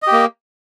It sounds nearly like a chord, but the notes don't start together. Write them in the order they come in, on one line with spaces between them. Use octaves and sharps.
D#5 G4 A#3